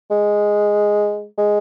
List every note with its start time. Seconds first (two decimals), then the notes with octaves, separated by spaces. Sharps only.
0.11 G#3
1.37 G#3